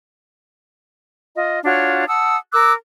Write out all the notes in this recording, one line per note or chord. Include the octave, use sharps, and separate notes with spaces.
F4 D#5
D4 F4 F#4 C#5
F#5 A5 D#6 E6
A#4 D6 E6 F#6